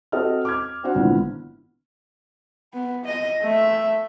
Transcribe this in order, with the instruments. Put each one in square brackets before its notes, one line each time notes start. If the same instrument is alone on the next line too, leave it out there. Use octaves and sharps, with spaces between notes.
[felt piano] C4 F#4 A4 D#5 D#6 F6
D6 F6 G#6
C4 D4 F#4 C5 F#5
G#1 A#2 D3 E3 B3 E4
[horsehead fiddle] B3
D#5
A3 E5